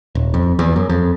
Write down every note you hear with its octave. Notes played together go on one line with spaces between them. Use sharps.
D#1
F2
E2
F#2
F2